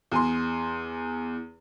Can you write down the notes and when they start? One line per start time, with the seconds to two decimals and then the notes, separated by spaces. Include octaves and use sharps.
0.11 E2 G#5 C6